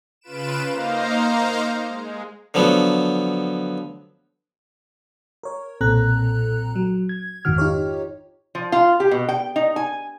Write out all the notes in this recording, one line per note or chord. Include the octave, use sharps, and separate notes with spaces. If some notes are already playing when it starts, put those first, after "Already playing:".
C#3 F4 B4 D7 E7
A#3 D#4 C5 F5 A#5
G#3
D3 F3 F#3 B3
A#4 C#5
B1 A#2 C4 A4 A#5 F#6
F#3
G#6
G#1 F2 G#2 D#3 F#4 F6
D#4 F4 G4 C#5
F3
F4
G4
B2
G5
D#4
G#5